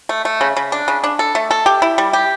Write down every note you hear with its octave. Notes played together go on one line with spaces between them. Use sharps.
A3
A3
C#3
C#3
D4
C#3
D4
A4
A3
A4
G4
E4
G3
G4